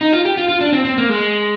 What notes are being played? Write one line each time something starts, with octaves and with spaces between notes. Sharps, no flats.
D#4
F4
G4
F4
F4
D4
C4
C4
A#3
G#3